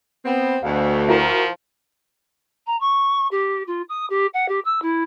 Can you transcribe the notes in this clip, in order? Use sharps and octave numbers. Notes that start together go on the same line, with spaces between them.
B3 C4
D2 B2 F5
F3 E4 F#4 A#4
A#5
C#6
G4
F4
D#6
G4
F#5
G4
E6
E4